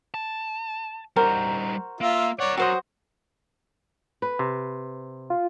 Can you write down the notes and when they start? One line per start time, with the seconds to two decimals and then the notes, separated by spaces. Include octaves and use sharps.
0.14 A5
1.16 G3 D#4 F#4 A#4 C5
2.01 A#3 F4 E5
2.40 A#4 C#5 D5 F#5
2.57 F#3 F#4 C5 D#6
4.22 B4
4.39 C3
5.30 F4